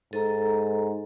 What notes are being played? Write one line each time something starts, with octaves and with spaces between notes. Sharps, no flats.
G#2 A4 A#5